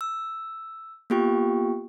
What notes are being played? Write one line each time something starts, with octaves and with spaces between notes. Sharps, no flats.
E6
A#3 B3 F4 G4 G5 C#6